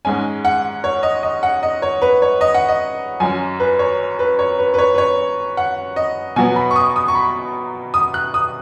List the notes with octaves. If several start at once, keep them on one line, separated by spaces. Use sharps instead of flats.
G#2 G#3 C#4 G#5
F#5
C#5
D#5
D#5
F#5
D#5
C#5
B4
C#5
D#5
F#5
D#5
F#2 F#3 C#4 G#5
B4
C#5
B4
C#5
B4
B4
C#5
B4
C#5
F#5
D#5
B2 F#3 B3 G#5
B5
C#6
D#6
D#6
C#6
B5
D#6
F#6
D#6